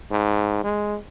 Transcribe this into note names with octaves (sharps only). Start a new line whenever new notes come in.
G#2
G#3